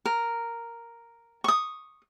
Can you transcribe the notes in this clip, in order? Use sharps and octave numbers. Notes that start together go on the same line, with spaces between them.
A#4
C#6 D#6